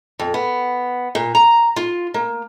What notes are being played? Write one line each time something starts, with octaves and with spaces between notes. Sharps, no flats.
F2
B3
A#2
A#5
F4
A#3